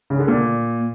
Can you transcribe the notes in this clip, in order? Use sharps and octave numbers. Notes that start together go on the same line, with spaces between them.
C#3
D3
A#2